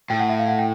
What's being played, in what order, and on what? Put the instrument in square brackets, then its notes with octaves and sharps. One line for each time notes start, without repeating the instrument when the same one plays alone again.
[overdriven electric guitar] A2 [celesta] G5
[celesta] F#5
E5
F5
F#5
G5